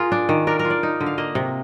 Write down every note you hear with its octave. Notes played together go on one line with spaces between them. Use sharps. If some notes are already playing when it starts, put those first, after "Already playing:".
Already playing: F4 G#4 A#4
D4
D#3
D4 A#4
A#4
F4
D5
D#4
D3
F5
A#3 D#5
C3